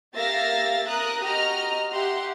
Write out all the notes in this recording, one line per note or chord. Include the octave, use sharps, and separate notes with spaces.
A#3 G4 E5 F5 A6 A#6
A#4 A#5 D#6 F#6
F#4 G4 D#5 A#5 F6
G4 E5 F#5 C6